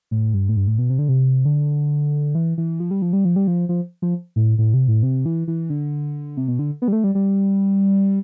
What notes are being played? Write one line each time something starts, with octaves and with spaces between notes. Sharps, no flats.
A2
G2
A2
G2
A2
B2
C3
D3
C3
D3
E3
E3
F3
G3
F3
G3
F3
G3
F3
F3
F3
A2
A2
C3
A2
C3
E3
E3
D3
C3
B2
D3
B3
G3
A3
G3
G3